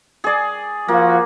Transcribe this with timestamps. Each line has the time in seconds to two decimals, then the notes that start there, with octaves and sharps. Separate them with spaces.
0.24 G#4 D5
0.88 F3 A#3 F4 F#4